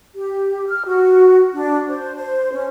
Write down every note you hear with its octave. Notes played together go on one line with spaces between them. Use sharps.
G4
F6
F#4
D4
C5
C5
C#4